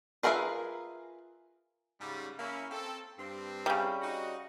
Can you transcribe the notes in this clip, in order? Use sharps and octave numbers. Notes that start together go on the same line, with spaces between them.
F4 G#4 A#4 B4 E5
G#2 C#3 G3
A#3 C#4 E4
C4 A4
G2 C4
C#3 G3
D#4 F#4